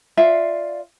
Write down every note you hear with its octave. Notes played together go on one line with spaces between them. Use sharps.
F4 D5 E5 F5